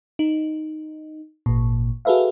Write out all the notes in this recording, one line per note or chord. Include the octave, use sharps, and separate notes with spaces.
D#4
G#1 A#2
F#4 G#4 A4 B4 E5 F5